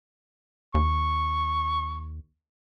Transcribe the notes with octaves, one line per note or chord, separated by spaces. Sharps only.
D#2 C#6